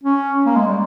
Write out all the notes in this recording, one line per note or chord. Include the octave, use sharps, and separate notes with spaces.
C#4
A#3
G#3
G3